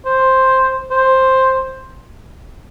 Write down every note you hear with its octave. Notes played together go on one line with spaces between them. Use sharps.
C5
C5